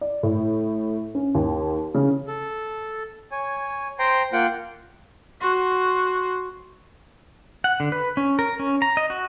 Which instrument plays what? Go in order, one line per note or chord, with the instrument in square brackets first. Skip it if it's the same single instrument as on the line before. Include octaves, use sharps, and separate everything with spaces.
[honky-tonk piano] D5
A2
C#4
D#2
C#3
[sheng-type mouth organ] A4
C#5 G#5
C5 G5 A#5 C6
A#3 F4 F#5 G5
[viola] F#4 C6
[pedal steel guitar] F#5
D3
B4
C#4
A#4
C#4
A#5
D#5
F#4